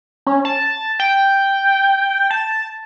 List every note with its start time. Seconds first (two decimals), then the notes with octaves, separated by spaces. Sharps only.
0.27 C#4
0.45 A5
0.99 G5
2.30 A5